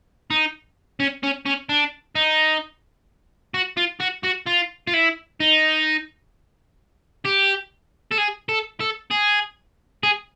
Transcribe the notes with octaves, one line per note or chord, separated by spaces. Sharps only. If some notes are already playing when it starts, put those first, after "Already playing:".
D#4
C#4
C#4
C#4
D4
D#4
F#4
F4
F#4
F#4
F4
F4
E4
D#4
G4
A4
G#4
A4
A4
G#4
G#4